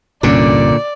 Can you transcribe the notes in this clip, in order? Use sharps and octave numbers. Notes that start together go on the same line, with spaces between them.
C2 G2 A#2 D3 C#4 D5